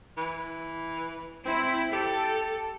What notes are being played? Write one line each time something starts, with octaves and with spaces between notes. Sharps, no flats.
E3
C4 E4
G4 A4